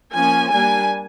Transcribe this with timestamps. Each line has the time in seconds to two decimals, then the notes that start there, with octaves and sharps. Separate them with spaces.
0.14 F3 A#3 C#4 G#5
0.52 G3 A#3 D4 G#5